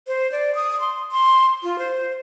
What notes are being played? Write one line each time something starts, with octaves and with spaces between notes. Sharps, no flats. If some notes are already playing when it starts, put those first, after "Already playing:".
C5
D5
D#6
C6
C6
F4
C5